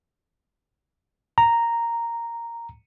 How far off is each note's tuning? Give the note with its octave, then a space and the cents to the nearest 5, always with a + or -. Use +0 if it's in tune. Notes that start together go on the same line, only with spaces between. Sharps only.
A#5 -5